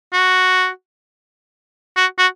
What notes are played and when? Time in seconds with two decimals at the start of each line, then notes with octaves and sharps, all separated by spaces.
0.13 F#4
1.96 F#4
2.18 F#4